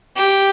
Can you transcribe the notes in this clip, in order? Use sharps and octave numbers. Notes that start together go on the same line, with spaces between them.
G4